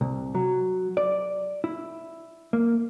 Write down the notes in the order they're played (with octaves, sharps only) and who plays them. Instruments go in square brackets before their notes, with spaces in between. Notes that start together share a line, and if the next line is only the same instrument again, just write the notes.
[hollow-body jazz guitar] C2
F#3
D5
E4
A#3